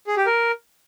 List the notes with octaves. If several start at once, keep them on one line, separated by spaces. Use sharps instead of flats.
G#4
G4
A#4